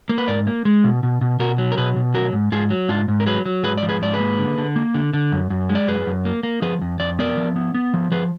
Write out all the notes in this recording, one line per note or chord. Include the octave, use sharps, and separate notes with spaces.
A#3
B4
G#2 A#4 D5
A#3
G#3
B2
B2
B2
B2 F#4 A#4
F#3
A#4
B2 G#4 B4
B2
F#3 F#4 A#4
G#2
G#2 F4 G#4
F#3
G#2 D4 F4
G#2
A#4
F#3 G#4 B4
F#3
G#2 G#4 B4
D5
F3
G#4 B4
G#2 D5
G#4 B4
A#3
D3
D3
A#3
D3
D3
F#2
F#2
G#3
D5
F#2 G#4 B4
F#2
A#3
A#3
F3 G#4 B4
F2
F2 D5
B3 A#4 D5
F3
B3
B3
F3
F3 G#4 B4